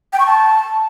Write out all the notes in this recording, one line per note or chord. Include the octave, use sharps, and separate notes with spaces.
G5
C#6
A5